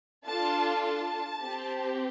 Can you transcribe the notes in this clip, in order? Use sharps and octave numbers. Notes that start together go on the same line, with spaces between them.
D4 F4 A4 A5
A5
C4 G4